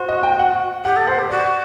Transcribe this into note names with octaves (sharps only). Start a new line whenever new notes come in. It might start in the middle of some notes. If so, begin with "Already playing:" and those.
Already playing: F#4 C5
D#5
G5
F#5
G4 F#5
A4
C5 F#5
G4
F#4 D5